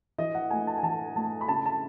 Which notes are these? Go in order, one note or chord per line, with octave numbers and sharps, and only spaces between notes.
E3 D#5
F#5
A3 G#5
A5
G#5
E3 A5
A3 A5
B5
C#3 A5
A5